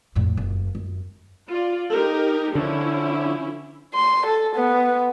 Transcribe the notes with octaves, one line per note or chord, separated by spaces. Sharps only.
F2 A2
F#1
F#2
F4 D5
D#4 G4 A#4
D3 F3 C#4 E4
C6
A4
B3